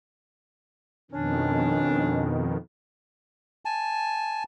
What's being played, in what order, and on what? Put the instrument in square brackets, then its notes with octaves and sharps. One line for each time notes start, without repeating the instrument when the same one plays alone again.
[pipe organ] F2 B2 D#3 [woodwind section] C#4 D4
[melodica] G#5 A5